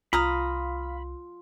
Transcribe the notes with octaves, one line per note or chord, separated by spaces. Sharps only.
C2 F4 F5 A#5 B5 D#6